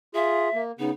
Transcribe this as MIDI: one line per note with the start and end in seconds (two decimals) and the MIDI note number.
0.15 0.49 65
0.15 0.49 68
0.15 0.62 76
0.54 0.72 58
0.79 0.91 49
0.79 0.91 59
0.79 0.90 63